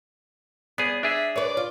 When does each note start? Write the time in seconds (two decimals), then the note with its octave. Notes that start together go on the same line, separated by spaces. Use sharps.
0.78 B3 G#4 D5
1.03 D4 G#4 E5
1.36 B4 C#5 D5
1.57 F4